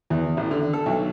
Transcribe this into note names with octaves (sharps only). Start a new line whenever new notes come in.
E2
A1
D3
A4
B1